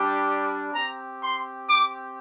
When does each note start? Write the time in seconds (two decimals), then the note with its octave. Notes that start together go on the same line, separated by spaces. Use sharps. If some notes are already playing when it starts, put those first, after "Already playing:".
Already playing: G3 D4 G4
0.73 C4 G4 A#5
1.20 C6
1.68 D6